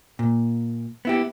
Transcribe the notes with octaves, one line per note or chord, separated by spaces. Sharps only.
A#2
B3 E4 G4